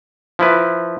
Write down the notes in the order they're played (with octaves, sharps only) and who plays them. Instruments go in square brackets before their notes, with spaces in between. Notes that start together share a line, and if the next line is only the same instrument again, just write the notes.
[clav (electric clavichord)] F3 E4 B4